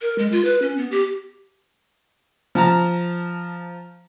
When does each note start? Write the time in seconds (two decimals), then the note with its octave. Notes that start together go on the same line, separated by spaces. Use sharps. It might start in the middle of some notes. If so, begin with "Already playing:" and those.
0.02 A#4
0.18 G#3
0.32 F4
0.45 B4
0.62 C#4
0.77 B3
0.91 G4
2.55 F3 A5 A#5